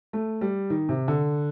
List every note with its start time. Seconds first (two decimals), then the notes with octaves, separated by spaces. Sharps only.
0.13 A3
0.41 G3
0.70 D#3
0.89 C3
1.08 D3